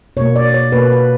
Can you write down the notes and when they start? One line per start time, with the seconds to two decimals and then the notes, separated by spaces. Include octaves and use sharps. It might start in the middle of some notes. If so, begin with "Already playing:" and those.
0.17 B2 C#5
0.21 A#3
0.35 D5
0.54 C#5
0.72 B2 A#3 B4
0.92 B4